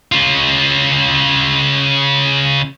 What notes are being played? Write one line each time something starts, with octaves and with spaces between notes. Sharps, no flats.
C#3 F4